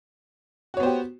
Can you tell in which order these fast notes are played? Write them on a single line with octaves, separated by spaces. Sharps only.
F#4 C#5 B3 C5 G4